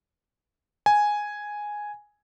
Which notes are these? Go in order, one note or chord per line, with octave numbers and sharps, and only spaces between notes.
G#5